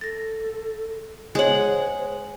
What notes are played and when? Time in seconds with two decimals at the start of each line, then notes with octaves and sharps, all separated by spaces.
0.01 A4 A6 A#6
1.35 G#3 G#4 C5 C#5 F#5